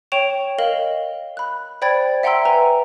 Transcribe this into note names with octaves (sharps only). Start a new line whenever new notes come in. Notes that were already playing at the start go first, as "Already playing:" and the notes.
C#5 G5 C#6 D7 E7 F7
A#4 D#5 F5 F#7 G7
B5 F#6
C5 D5 G5 B5 G#6 A6
E5 F#5 G5 A#5 C6 E6
B4 G#5 A#5